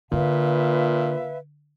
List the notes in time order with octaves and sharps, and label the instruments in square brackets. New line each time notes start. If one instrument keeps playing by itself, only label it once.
[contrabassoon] A#2 [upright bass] D3 [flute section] B4 E5 F5